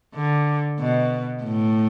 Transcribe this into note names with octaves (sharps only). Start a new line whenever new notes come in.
D3
B2
A2